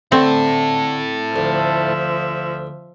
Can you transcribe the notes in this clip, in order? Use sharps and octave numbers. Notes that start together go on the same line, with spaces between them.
D3 C4 E4 A4
D2 F3 E5